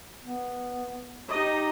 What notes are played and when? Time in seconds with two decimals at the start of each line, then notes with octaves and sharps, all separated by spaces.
0.24 B3
1.30 D#4 G4 D#5